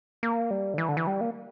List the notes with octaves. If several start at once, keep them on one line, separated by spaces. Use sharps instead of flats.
A#3
G3
D3
E3
D3
E3
G3
A#3